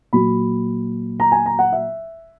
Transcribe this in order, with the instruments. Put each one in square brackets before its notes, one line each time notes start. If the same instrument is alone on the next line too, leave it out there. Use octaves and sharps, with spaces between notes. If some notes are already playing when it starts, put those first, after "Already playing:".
[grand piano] A#2 F#3 B5
A#5
G#5
A#5
F#5
E5